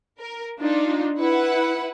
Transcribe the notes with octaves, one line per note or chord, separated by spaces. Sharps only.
A#4
D4 D#4 F4
E4 B4 F#5